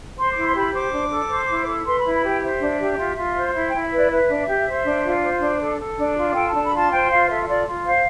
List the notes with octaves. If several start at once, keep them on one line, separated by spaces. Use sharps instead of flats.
C5 C6
E4 D6
C6
G4 B5
C5 D6
D4
A4
C5
E4
A4
B4 C6
E4 B5
B5
G4 G5
C5 E5
D4
G4
F4
F4
C5
E4 E5
G5
E4
E5
B4 D5
B4 E5
D4
G4
C5
D4
F4
C5
D4
A4
A4
D4
F4
A4 G5
D4 A5
B5
F4 A5
C5 G5
F4 F5
A4 E5
E5
F4 D5
F4
C5 F5